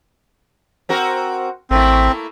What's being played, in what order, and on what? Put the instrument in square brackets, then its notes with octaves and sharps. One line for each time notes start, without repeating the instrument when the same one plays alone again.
[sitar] C4 F#4 A#4
[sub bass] A1 [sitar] A3 A#3 E4 [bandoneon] C4